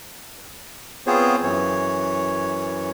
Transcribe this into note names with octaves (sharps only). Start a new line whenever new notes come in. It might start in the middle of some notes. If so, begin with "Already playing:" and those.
B3 C4 F4 G#4 C5 C#5
F#2 E3 C#5